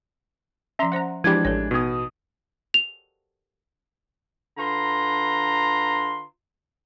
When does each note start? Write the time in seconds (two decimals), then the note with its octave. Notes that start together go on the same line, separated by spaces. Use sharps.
0.79 F3 C#4 E5 A#5 C6
0.92 C#4 C5 F#5 A#5 C6
1.24 E3 F3 G#3 D4 E4 G4 B5 G#6
1.45 A1 A4 C#5
1.71 B2 B3 D#4 D#6
2.74 F7
4.58 D3 F4 B4 A#5 C6